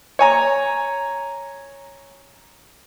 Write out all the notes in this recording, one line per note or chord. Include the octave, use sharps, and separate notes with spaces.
C#5 G#5 A#5